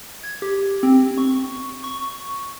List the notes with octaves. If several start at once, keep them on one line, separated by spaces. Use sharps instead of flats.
G#6
G4
C4
C#6
C#6